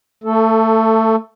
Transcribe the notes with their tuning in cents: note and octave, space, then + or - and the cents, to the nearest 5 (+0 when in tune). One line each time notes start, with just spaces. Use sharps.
A3 +25 A4 +0